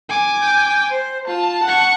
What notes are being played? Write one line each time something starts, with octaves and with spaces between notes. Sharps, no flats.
G#5 D6
G5
C5
F4 A5
F#5 C#6